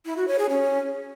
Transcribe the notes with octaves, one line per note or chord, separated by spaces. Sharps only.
E4
F#4
C#5
G#4
C#4